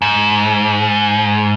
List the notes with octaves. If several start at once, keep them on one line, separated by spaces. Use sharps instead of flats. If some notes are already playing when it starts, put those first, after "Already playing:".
G#2